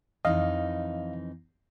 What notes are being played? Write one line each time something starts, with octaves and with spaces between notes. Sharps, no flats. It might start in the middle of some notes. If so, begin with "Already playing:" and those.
F2 E3 D#4 D#5 F5